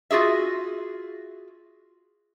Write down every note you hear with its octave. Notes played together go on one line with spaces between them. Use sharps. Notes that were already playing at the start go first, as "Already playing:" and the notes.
F4 F#4 G#4 E5